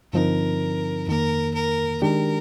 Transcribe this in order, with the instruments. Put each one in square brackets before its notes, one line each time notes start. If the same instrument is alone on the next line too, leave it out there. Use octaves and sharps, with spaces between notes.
[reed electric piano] G2 D3 F3 C4 D#4 [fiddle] A#4
[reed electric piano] F2 D#3 A#3 [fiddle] A#4
[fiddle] A#4
[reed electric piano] D#3 G#3 D4 G4 [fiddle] A#4